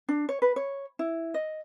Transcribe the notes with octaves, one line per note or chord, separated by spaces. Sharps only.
D4
C#5
B4
C#5
E4
D#5